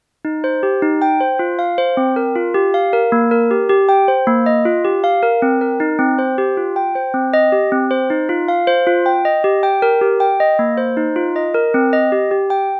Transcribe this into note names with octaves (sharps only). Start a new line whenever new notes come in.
D#4
C5
G4
D#4
G5
C5
F4
F5
C5
C4
A#4
F4
G4
F5
A#4
A#3
A#4
G4
G4
G5
C5
A#3
D#5
F4
G4
F5
A#4
C4
A#4
D#4
C4
C5
G4
F4
G5
C5
C4
D#5
G4
C4
C5
D#4
F4
F5
C5
F4
G5
D#5
G4
G5
A#4
G4
G5
D#5
A#3
C5
D#4
F4
D#5
A#4
C4
D#5
G4
G4
G5